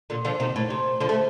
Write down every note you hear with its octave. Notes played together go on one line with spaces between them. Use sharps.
A#2 D3
D3 F3
C3 D#3
A2
C3
D3 F3
A3